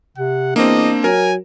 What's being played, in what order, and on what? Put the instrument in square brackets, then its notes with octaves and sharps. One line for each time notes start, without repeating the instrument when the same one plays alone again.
[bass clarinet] C3 [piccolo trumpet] F#5
[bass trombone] E2 [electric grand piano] A#3 C4 [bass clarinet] D4 [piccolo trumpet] D#5
[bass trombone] F#3 [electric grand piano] A#4 [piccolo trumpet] G#5